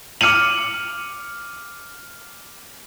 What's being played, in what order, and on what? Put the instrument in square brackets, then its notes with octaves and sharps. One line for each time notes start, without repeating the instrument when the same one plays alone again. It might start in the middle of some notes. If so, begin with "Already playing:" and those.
[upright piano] D6 F6 C#7 D#7 F#7